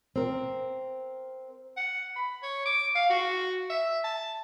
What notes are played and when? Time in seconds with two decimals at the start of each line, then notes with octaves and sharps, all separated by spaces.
0.16 C4 A#4
1.77 F#5
2.16 B5
2.43 C#5
2.65 D6
2.95 F5
3.09 F#4
3.70 E5
4.04 A5